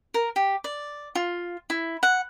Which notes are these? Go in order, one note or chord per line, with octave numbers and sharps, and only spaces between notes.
A#4
G4
D5
F4
E4
F#5